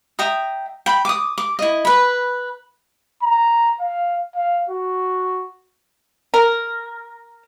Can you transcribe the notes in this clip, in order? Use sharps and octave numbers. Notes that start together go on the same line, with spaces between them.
E5 G5 A#5 D#6
G5 B5
D6 D#6
D6
E4 D#5
B4 B5
A#5
F5
F5
F#4
A#4